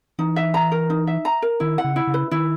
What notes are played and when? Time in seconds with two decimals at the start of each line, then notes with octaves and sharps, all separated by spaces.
0.18 E3 D#4
0.36 E5
0.54 A#5
0.72 A#4
0.90 D#4
1.07 E5
1.25 A#5
1.42 A#4
1.60 D#3 E4
1.78 F#5
1.84 C#3
1.96 E4
2.07 C#3
2.14 B4
2.31 D#3 E4